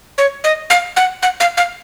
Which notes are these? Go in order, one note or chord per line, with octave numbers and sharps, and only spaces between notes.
C#5
D#5
F5
F#5
F#5
F5
F5